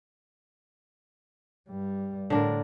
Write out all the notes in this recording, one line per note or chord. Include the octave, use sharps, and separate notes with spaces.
G2 G3
A2 D3 D4 A#4